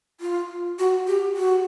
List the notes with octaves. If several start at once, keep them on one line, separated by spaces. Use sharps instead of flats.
F4
F#4
G4
F#4